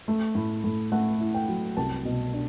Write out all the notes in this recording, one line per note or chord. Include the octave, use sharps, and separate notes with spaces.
A3
A2
A2
A3 F#5
E4
G5
F#3
C2 A5
B2
D4